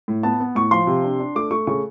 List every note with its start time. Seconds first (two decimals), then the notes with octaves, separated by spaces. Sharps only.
0.08 A2
0.23 B3 A5
0.40 B3
0.55 A2 C#6
0.71 F3 C6
0.87 C3
1.04 D4
1.19 D4
1.35 A3 D6
1.51 A3 C#6
1.67 C#3 C#6